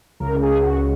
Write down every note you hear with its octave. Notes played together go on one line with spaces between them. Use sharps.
C#2 C#3 A#4
G#4
F#4